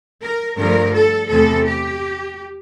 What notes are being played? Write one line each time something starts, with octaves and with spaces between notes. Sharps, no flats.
A#4
G2 D3 F3 A3 A#4
A4
E2 C3 E3 A3 A4
G4